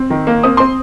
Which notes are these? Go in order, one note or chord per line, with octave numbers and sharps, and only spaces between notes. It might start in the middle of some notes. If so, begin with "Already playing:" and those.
Already playing: C4
D#3
A#3
C4 D#6
C4 C6